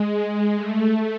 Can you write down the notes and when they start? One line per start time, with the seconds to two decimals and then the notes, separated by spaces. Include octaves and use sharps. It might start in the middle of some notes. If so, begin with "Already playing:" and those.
Already playing: G#3
0.56 A3